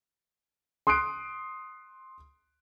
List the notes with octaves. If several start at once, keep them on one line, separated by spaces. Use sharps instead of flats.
C6 D#6 F#6 C7 D7